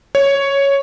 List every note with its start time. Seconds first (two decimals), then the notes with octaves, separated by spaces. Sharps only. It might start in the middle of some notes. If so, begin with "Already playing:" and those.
0.15 C#5